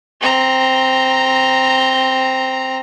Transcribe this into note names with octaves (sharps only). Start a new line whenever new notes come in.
C4 A#5